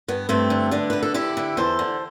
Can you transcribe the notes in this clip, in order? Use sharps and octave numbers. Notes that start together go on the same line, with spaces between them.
G2 B3
G2 A3 C4
D3
D3 B3 D4
D3 B4
A4
D3 E4 G4
D3
E2 A4 C5
D3